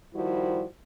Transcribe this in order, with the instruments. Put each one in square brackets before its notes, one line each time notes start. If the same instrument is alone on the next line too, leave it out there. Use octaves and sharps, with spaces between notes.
[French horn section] D#3 F3 G3 E4 F#4 C5